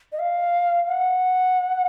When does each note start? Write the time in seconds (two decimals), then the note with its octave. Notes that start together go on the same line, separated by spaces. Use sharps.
0.12 D#5
0.19 F5
0.87 F#5